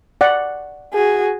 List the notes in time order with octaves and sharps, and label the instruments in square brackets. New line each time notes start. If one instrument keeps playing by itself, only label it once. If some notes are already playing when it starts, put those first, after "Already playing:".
[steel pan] D5 F#5
[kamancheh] F#4 G#4